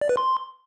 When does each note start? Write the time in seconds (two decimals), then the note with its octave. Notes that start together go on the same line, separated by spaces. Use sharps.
0.01 D5
0.09 B4
0.17 C6